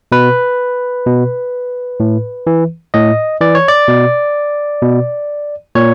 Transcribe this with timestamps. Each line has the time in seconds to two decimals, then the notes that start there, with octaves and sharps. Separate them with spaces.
0.12 B2 B4
1.06 B2
2.00 A2
2.47 E3
2.94 A2 D#5
3.40 E3 D5
3.55 C#5
3.68 D5
3.88 B2
4.82 B2
5.75 A#2 C#5